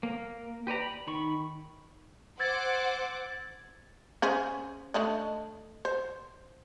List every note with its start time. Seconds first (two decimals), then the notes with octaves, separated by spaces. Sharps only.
0.03 A#3
0.67 G4 B4 D5 A#5
0.80 B5
1.07 D#3 B5 C#6
2.39 C5 F#5 D6 E6 G#6 A6
4.22 C#4 G#4 C5
4.94 A3 D4 D#5
5.85 C5